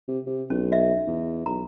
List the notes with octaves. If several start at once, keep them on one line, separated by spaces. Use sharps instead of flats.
C3
C3
B1 C#4
D#5 E5
E2
B1 A#5